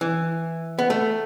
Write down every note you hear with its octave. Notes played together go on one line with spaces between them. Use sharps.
E3
B3
A3